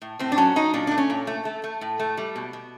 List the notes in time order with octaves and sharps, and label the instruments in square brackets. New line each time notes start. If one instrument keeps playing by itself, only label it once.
[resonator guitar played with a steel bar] A2
A2 C4
D4
F#3 C#4
F#3 D#4
A#2 D4
A3 D4
C#4
A#2
A3
A3
A3
A2
A3
G3
B2
B2